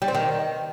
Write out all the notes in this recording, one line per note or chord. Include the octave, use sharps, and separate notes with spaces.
G3
C4
D#3